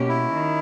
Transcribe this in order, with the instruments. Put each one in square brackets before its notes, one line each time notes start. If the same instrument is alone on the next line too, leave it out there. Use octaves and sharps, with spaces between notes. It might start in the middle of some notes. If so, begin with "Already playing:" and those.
Already playing: [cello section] B2 A#3 C#4 G4
[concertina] E4
[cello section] D#3